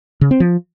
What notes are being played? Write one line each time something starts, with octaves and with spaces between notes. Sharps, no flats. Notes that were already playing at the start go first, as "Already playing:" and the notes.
C#3
C4
F3